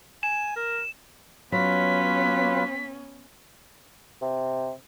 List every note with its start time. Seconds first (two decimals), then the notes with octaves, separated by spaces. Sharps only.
0.23 G#5 E7
0.56 A#4
1.52 F#3 B3 C#4 F4 B4 B6
4.22 C3